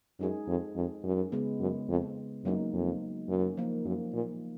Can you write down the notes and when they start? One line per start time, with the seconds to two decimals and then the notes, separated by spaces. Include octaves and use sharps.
0.19 F#2 G#3 D#4 G#4
0.48 F2
0.76 F2
1.04 F#2
1.32 C#3 G#3 B3
1.60 F#2
1.89 F2
2.45 F#2 F#3 A#3 D#4
2.73 F2
3.29 F#2
3.57 F3 A#3 D#4
3.85 F#2
4.13 A#2